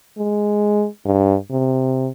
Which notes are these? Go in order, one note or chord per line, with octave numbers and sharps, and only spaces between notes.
G#3
G2
C3